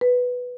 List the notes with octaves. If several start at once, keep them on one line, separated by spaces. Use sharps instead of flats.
B4